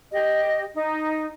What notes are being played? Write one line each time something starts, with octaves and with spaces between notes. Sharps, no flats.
G4 D#5
D#4